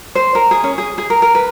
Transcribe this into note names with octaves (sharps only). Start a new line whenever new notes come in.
C5
A#4
G#4
C#4
G#4
G#4
A#4
A#4
B4